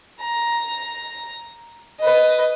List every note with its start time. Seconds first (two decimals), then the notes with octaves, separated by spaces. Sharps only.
0.21 A#5
2.00 B4 D#5